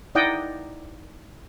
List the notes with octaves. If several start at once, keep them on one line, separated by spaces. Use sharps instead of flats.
D#4 E4 D5 D#5 F#5 G5